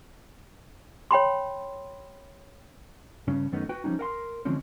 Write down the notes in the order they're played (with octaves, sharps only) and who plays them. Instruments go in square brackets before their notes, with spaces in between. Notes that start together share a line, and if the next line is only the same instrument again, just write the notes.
[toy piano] C#5 G5 B5 C6
[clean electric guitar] G2 C#3 C#4
F#2 D#3 A3 B3 C#4 D#4
F#4 B4 G5
F3 G3 A3 C#4 D#4
A#4 F#5 C6
D3 E3 F3 G#3 C4 C#4